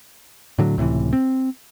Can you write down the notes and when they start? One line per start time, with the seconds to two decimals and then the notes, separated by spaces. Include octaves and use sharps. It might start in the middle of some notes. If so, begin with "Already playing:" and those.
0.58 A2 D3 F#3
0.78 C#2 A2 C3 E3
1.13 C4